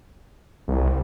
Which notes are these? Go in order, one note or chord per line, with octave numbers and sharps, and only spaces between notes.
C2